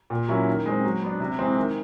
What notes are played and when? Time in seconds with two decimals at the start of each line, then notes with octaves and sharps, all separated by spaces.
0.10 A#2
0.28 F#3 A#3 C#4 E4
0.47 D#3
0.66 G#3 C4
0.84 F#3
1.02 B3 D4
1.20 C3
1.38 E3 G#3 C4
1.57 D#3